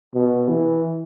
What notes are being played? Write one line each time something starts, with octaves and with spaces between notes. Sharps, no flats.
B2
E3